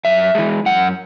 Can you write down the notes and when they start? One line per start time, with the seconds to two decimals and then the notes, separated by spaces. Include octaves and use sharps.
0.05 F#2 E5
0.35 E3 G#3
0.66 F#2 F#5